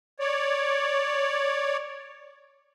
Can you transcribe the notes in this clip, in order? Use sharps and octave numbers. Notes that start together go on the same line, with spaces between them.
C#5 D5